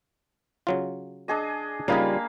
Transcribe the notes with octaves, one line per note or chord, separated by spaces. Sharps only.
C#3 F#3 F4
D4 G#4 D#5
C#3 G3 A#3 D#4 F4 D#5 F5 B5